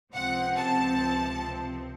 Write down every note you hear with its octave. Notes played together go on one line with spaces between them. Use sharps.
C#2 C3 F3 C4 F#5
A5